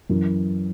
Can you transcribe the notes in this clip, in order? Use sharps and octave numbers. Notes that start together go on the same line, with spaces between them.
F#2 E3